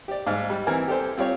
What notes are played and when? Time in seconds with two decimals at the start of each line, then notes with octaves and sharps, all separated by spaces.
0.08 G4 D5
0.27 G#2 F5
0.50 G3
0.67 E3 C4 A#4 G#5 F6
0.88 G4 A4 C5
1.17 C4 F4 G4 C#5